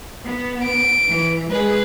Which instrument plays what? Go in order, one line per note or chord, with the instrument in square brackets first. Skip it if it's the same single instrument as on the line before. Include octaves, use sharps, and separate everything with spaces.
[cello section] B3
[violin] D7
[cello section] E3
[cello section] G#3 G#4 [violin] B4